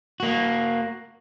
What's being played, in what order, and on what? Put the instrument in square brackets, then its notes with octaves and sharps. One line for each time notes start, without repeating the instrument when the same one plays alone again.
[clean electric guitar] A#3 F#4